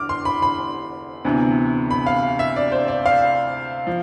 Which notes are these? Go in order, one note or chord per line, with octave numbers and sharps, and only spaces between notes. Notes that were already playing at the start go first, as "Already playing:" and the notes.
Already playing: E2 D3 D6 F6
C6
B5
B5
D2 C3 E3 B3
B5
F5
E5
D5
C5
D5
F5
F3